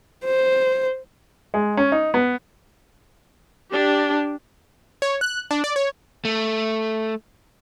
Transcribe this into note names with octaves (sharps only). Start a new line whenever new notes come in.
C5
G#3
C#4
D#4
B3
D4 G4
C#5
F#6
D4
D5
C#5
A3